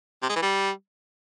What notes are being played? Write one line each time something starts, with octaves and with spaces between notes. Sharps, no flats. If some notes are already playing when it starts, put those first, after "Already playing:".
C3
G#3
E3
G3